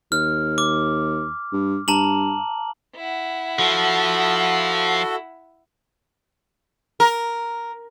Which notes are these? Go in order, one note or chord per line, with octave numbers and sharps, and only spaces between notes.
D#2 F6
D6
G2
G2 A5 A#5 F#7
E4 F#5
F3 F#4 A4
A#4